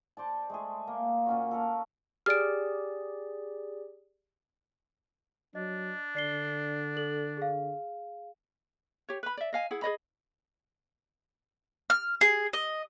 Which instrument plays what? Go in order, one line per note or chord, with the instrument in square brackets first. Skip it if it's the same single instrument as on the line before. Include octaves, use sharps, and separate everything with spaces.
[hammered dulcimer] C5 D5 A5
G#3 A3 G#4
A#3
A#2 C#4 F#4
A4 A#4 F5
[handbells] G4 G#4 D5 [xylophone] F6 D7
[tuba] F#3 [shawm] D4 [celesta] D#5
[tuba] D3 [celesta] D5 C7 G7
[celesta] A4 F#7
G#4 F5
[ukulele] G4 C#5
B4 B5
D5 E5
D#5 F5 G#5
E4 G#4 F#5
G#4 C#5 D#5 B5
[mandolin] F6
G#4
D#5